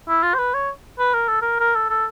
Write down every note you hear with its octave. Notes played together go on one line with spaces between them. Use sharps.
E4
F4
C5
B4
C#5
B4
A#4
A4
A#4
A#4
A4
A4